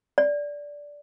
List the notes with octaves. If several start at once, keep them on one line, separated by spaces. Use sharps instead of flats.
D5